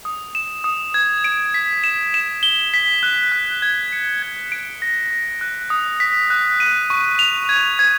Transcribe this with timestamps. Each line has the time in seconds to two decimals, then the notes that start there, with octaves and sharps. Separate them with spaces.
0.05 D#6
0.35 E7
0.64 D#6
0.94 G#6
1.24 D7
1.54 B6
1.84 E7
2.14 E7
2.43 G7
2.74 B6
3.03 F#6
3.32 F#6
3.62 G#6
3.92 C#7
4.22 G#6
4.52 D7
4.82 A#6
5.11 A#6
5.41 F#6
5.70 D#6
6.00 B6
6.30 F#6
6.60 D#7
6.90 C#6
7.19 F7
7.49 G#6
7.79 G#6